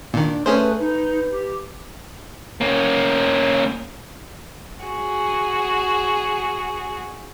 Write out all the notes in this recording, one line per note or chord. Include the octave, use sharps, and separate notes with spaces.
A#2 D#3 D4
A3 C#4 G#4 B4 C5
D#4 B4
G4
A#3 C#4
F#4 G#4